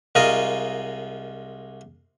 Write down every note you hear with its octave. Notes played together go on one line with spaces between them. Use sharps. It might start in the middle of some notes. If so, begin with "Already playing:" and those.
C2 G#3 F4 A#4 D#5